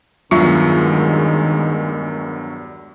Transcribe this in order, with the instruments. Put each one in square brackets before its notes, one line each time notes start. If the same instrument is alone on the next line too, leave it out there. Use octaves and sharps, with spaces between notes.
[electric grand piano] E2 G2 F#3 [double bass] D#3 G#3 [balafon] F4 E5